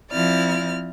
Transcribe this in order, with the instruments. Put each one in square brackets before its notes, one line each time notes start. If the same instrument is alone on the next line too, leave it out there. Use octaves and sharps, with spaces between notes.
[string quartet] F3 C4 E4 D5 F6